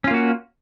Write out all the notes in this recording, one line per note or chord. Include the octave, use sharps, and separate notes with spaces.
A#3 C#4 F4 F#4